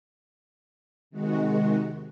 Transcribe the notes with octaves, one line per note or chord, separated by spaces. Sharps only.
C3 D#3 G#3 F#4